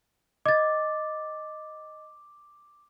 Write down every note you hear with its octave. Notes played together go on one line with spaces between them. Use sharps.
D#5 D6 A6